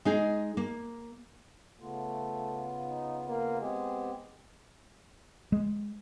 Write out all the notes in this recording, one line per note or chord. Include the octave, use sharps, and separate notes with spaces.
G#3 D#4 G#4
A#3
C#3 A3 B3 F4
D#4
A#3
G#3 B3 C4 G4
G#3